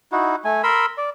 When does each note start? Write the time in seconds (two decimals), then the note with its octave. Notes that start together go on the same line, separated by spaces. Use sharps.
0.12 D#4 E4 F#4
0.45 A3 G#5
0.63 A#4 B5 C6 E6
0.98 D5